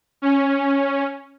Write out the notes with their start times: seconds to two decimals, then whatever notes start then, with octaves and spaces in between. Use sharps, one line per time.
0.22 C#4